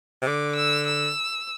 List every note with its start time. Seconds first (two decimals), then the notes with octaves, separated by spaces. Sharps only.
0.22 C3
0.27 D3 D6
0.57 E6
0.87 E6